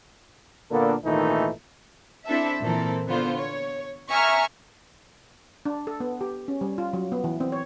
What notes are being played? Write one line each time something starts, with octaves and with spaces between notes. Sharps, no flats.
A#2 D3 A#3 B3 D4 A4
G#1 A#2 D#3 E3 A3 D#4
C4 D4 E4 A4 E5
A#2 E3 C4 A4 A#4
D3 B3 F4 C5
C#5
E5 G#5 A#5 C#6 F6
D4
A4
B3
G4
C#4
G3
F4
F#3
B3
E3
C4
C#5